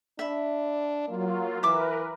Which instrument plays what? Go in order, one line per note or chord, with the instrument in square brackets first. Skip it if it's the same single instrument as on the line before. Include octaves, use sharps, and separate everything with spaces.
[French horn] D4 [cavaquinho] E5 B5
[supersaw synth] F#3 F4 [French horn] A#3
[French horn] E3 [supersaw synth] A#4 B4 [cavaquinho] E5 D6